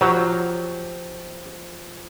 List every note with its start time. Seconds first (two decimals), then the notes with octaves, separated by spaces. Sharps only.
0.01 F3 F#3 G4